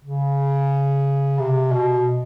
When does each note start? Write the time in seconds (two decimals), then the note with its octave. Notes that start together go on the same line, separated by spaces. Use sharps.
0.04 C#3
1.39 C3
1.72 B2